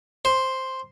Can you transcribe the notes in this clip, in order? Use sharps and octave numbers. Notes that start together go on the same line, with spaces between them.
C5